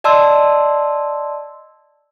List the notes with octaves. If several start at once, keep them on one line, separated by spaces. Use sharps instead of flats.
D5 D#5 A5 C6 E6